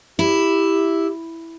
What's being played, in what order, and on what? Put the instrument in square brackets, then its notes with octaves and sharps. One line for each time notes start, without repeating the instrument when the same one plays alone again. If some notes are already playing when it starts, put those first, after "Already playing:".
[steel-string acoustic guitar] E4 [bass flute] G4